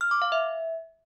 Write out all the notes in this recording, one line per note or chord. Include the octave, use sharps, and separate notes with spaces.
F6
D6
F5
E5